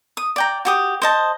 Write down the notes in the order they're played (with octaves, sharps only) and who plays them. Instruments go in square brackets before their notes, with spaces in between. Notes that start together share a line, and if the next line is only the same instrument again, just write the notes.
[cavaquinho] D#6
D5 G5 A#5
F#4 G4 D#6
C5 D#5 A5